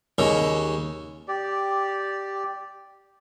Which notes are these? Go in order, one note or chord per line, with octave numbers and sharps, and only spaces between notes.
D#2 C#3
G4 D5